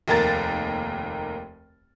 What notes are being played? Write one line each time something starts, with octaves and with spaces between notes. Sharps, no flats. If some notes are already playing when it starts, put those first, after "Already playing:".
F1 D#2 A#4 A6